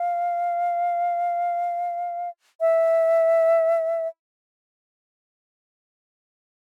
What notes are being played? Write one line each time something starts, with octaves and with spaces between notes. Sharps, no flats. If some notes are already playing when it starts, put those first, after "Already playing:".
Already playing: F5
E5